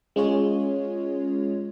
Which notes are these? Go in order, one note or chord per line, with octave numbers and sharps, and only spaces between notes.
G#3 C#4 F4 G#4 C#5